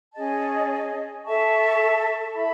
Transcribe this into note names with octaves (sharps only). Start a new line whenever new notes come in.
C#4 G#4 D#5 A5
A4 E5 A5 C#6
E4 A4 E5 B5